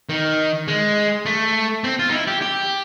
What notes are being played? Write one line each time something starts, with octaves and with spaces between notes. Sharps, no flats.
D#3
G#3
A3
C4
F4
D#4
E4
G4
G4